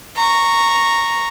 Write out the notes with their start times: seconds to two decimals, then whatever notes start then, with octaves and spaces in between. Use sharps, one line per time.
0.16 A#5 C#6